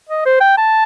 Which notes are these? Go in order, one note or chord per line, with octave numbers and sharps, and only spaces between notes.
D#5
C5
G5
A5